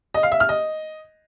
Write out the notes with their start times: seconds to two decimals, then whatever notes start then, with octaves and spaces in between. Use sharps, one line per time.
0.14 D#5
0.23 F5
0.32 E5
0.40 F6
0.49 D#5